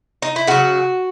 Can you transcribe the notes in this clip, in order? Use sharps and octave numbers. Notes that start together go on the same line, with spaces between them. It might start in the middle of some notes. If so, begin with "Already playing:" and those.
D#4
E4
C#3 F#3 F#4